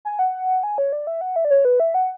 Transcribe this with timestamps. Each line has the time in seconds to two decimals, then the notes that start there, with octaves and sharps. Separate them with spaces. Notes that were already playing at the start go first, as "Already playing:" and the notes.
0.05 G#5
0.19 F#5
0.63 G#5
0.78 C#5
0.93 D5
1.07 E5
1.21 F#5
1.36 E5
1.45 D5
1.50 C#5
1.65 B4
1.80 E5
1.94 F#5